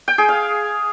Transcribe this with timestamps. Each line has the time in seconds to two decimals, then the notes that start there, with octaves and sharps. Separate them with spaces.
0.08 G5
0.18 G#4
0.29 F5